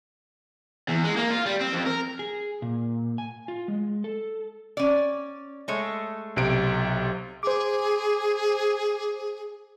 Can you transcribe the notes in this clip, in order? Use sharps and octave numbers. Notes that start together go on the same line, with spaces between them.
E2
G#3
A#3
F4
G3
C4
F2
A#4
G#4
A#2
G#5
F4
G#3
A4
C#4 D5
G#3 A3 C#5
B1 C3 D7
G#4 C5 D6